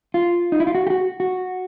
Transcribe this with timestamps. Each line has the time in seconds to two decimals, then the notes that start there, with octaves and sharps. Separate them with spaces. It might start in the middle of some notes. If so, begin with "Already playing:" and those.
0.14 F4
0.52 D#4
0.60 E4
0.67 F4
0.75 F#4
0.87 G4
0.90 F#4
1.20 F#4